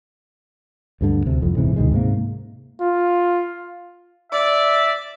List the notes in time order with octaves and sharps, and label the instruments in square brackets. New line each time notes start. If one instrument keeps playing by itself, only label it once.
[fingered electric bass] D2 G2 D3
D2 C3
C2 F2
D#1 G#2 C3 E3
D2 B2 D#3 G#3
G#2 C3 A#3
[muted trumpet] F4
[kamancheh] D5 [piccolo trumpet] E5